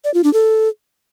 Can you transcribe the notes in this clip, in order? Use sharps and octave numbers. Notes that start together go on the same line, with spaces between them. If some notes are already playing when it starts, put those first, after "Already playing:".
D5
F4
D4
A4